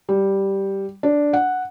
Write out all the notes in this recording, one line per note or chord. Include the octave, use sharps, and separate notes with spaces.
G3
D4
F#5